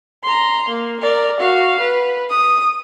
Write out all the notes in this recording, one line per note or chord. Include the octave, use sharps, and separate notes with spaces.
A#5 C6
A#3
A#4 D5
F#4 F5
B4
D#6